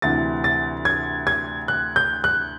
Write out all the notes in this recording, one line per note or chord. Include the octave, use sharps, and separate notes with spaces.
D2 C3 E3 A6
A6
G#6
G#6
F#6
G6
F#6